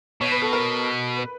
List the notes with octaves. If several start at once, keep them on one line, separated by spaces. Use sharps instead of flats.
B2 C#5
B4
A4
A#4
B4